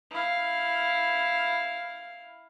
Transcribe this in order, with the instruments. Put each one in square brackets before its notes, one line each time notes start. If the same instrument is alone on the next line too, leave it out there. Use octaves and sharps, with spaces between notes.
[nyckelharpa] E4 F5